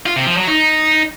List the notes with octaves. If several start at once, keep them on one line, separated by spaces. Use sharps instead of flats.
F4
C3
F3
F#3
D#4